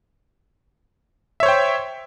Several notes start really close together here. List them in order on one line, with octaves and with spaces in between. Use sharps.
E5 C#5 C5 G5